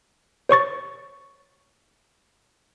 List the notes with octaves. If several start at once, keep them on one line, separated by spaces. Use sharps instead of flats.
C5 C#5 C#6 A6